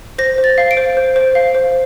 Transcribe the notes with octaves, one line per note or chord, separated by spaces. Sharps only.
C5 A#6
C5
A6
F5
D7
C5
C5
C5
F5
C5